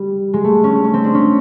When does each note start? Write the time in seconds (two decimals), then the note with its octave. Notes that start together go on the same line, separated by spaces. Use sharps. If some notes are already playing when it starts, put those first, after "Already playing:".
Already playing: G3
0.34 G#3
0.44 A3
0.64 C#4
0.84 C#4
0.94 C4
1.04 D4
1.15 C#4